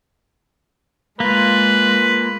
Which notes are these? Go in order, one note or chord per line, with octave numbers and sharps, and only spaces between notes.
G#3 A#3 F4 B4